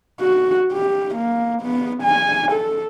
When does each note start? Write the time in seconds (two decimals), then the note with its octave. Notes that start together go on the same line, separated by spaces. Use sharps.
0.21 F#4
0.73 G4
1.15 A#3
1.62 B3
2.03 G#5
2.52 A4